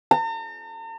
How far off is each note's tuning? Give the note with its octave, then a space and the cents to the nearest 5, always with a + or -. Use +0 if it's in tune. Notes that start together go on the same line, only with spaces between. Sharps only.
A#5 -45